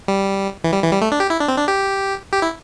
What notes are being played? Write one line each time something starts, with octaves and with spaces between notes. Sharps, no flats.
G3
E3
G3
E3
G3
A3
D4
G4
E4
D4
C4
D4
G4
G4
E4